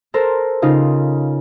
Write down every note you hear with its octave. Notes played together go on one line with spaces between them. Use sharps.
A4 A#4 C5
C#3 D#4 F4